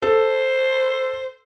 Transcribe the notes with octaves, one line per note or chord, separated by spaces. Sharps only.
A4 C5 A5